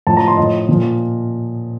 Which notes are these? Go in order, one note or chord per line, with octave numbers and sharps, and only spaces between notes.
A2 F3 A5
A#5
C6
A2 F3 D#5
A#2 F3